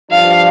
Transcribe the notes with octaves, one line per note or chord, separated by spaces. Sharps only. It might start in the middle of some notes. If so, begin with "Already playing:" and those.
G2 F3 D4 F4 F5